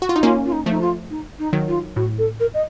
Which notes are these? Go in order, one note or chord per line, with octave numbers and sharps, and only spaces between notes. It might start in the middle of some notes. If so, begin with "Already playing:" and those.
F#4
F4
D#4
A#3 C#4 F4
F4
D#4
F3 A3 D#4
F4
D#4
D#4
D#3 F#3
F4
A2 F#4
A4
A#4
D#5